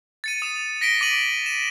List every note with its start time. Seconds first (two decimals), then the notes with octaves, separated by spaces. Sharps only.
0.24 A6 C#7 D#7
0.42 D#6 E7
0.81 A#6 B6 D7 G7
1.01 D6 A#6 D#7 F#7
1.46 E7